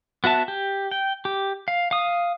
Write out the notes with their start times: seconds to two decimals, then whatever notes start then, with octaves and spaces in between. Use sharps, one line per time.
0.24 B3 F#4 E5 A5
0.48 G4
0.91 G5
1.25 G4
1.68 F5
1.91 F5 D#6